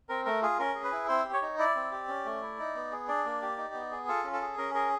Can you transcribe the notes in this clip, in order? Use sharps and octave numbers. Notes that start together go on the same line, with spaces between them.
C4 A#4
A3 A#4
F4 G#4
C#4 A#4
G#4
B4
E4
C4 C5
G4
C#5
D#4
E4 D5
C4
G4
C#4
A3
E4
D#4
B3
G#4
D4 D5
A#3
G4
D#4
B3
G#4
F4 A4
C#4
A4
G#4
C#4 A#4
G#4 A#4